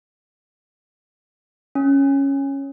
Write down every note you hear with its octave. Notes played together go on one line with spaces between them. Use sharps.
C#4